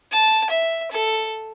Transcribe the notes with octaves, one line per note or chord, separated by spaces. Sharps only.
A5
E5
A4